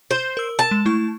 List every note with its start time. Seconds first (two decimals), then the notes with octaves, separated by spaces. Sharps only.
0.11 C5
0.37 A#4 E6
0.59 A5
0.71 G#3
0.85 A3 E4 C#6